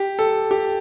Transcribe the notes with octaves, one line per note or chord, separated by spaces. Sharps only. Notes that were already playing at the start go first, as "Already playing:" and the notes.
Already playing: G4
A4
G4